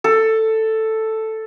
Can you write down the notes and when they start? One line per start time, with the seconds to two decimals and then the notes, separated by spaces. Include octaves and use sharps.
0.04 A4